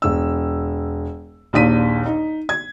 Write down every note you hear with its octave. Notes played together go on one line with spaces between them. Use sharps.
E1 E6
A#1 D#2 A#2 B6 D#7
D#4
G#6